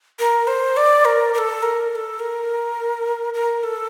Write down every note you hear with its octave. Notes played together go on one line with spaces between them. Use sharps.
A#4
C5
D5
A#4
A#4
A4
A#4
A#4
A4
A#4
A#4
A4